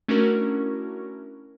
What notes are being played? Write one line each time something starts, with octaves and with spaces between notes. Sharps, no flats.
A3 C#4 D4 E4 F#4 A#4